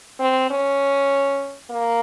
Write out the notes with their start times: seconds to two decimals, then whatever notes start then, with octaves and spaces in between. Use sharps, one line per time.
0.19 C4
0.51 C#4
1.70 A#3